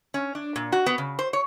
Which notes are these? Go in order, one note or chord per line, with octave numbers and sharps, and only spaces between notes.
C#4
D4
A#2
F#4
B3
C#3
C5
C#5